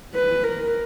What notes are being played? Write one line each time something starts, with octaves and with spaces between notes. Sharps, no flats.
B4
A#4